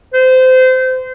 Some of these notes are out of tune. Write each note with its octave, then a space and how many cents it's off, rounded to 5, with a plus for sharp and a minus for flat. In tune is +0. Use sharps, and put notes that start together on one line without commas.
C5 -25